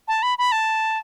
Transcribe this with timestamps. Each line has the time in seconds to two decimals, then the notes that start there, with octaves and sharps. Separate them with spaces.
0.08 A5
0.23 B5
0.38 B5
0.52 A5